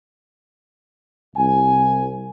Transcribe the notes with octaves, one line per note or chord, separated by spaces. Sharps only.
C2 G#5